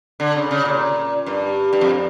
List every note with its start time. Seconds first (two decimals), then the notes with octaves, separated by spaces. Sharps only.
0.20 D3
0.36 C#3
0.51 C#3
0.65 A#2
1.26 G2
1.73 G2
1.81 F2